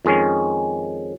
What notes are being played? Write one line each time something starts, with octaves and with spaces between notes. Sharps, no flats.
F2 D#3 G#3 C#4